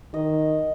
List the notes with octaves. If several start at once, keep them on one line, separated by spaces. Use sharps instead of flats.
D#3 D#5